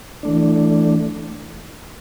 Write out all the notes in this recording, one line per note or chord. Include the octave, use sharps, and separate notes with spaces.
E3 A3 D4